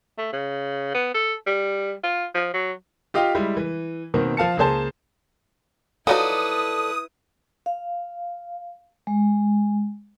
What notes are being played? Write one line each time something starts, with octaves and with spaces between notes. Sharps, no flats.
A3
C#3
B3
A4
G3
F4
F3
F#3
F4 G4 D#5 F5 G5
G3 G#3 E4
E3
B2 D#3 A#3 C4
F3 F5 A5 C#7
C#2 A#3 G#4 C5 A5
F3 F#3 D#4 E4 A4 B4 D5 D#6
F5
G#3